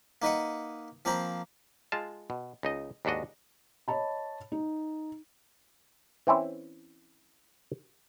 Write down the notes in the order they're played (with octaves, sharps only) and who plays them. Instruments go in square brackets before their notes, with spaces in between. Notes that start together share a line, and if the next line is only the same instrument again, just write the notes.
[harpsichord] A#3 D#4 B4 D#5 F#5
F3 A#3 C4 C5 A#5 B5
[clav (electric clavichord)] G#3 F4 A5
B2
C#2 D#4 D#5
D#2 G#2 D4 F#4 D#5
[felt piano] C#5 D#5 A5 B5
D#4
[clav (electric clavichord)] E3 C4 C#4 E4